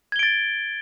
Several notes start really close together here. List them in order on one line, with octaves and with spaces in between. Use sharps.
G#6 G7 D7 A6